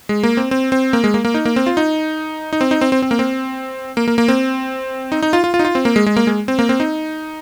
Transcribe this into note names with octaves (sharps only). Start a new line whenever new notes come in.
G#3
A#3
C4
C4
C4
A#3
G#3
A#3
A#3
D#4
A#3
C4
F4
D#4
D#4
C4
D#4
C4
C4
C4
A#3
C4
A#3
A#3
A#3
C4
D#4
D#4
F4
F4
F4
D#4
F4
C4
A#3
G#3
G#3
A#3
G#3
C4
A#3
C4
D#4